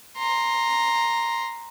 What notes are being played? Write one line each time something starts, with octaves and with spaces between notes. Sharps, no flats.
A#5 C6